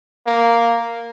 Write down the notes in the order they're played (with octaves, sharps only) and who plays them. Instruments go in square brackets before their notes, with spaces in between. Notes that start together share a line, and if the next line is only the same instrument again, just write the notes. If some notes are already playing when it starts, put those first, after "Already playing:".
[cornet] A#3